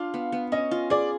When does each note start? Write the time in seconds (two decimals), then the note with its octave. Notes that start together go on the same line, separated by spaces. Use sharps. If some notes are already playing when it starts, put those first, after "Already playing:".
Already playing: D4 F4 F5
0.14 B3
0.32 B3
0.52 C#4 D#5
0.71 F4
0.90 G#4 D5